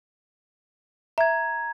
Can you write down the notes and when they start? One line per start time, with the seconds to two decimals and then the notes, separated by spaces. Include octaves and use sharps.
1.18 E5 A#5 G#6